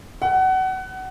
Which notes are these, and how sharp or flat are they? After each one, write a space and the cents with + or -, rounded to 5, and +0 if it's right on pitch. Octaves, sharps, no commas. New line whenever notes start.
F#5 +25